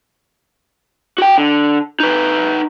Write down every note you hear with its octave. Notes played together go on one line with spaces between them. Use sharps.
F#4 G5
D3
D#4 B4